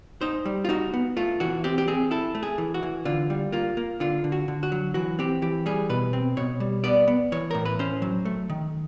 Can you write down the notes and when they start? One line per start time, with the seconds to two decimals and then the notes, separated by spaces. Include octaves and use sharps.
0.21 D#4 C5
0.46 G3
0.65 F4
0.69 D#4 F#4
0.94 B3
1.17 A3 F4
1.40 E3 F#4
1.64 C4 G4
1.78 G4
1.88 C4 G#4
2.11 E4 A4
2.35 A3
2.43 G#4
2.58 E3
2.74 F#4
2.83 E3
3.05 D3 F4
3.30 G3
3.52 A#3 F4
3.77 A#3
4.00 D3 F4
4.24 D3
4.32 F#4
4.48 D3
4.63 F#4
4.72 F#3
4.94 E3 F#4
5.19 C4 G4
5.42 E3 G4
5.66 G3 G#4
5.89 B2 B4
6.13 C4
6.37 B2 C#5
6.60 G3
6.84 B3 D5
7.08 B3
7.32 E3 C#5
7.51 A2 A#4
7.65 B4
7.79 C#4 C5
8.02 F#3
8.25 A3
8.50 D#3